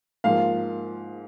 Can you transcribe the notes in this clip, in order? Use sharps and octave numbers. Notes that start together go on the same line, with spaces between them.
G#2 F3 A#3 F5